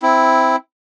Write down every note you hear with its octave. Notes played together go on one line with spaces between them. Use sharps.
C4 E4